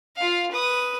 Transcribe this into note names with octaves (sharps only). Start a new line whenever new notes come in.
F4 F5
B4 D#6